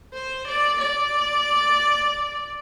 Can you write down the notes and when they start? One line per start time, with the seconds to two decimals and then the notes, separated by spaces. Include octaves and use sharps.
0.14 C5
0.48 D5
0.81 D5